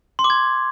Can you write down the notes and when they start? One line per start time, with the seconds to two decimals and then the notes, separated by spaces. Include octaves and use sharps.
0.19 C6
0.24 D6
0.30 G#6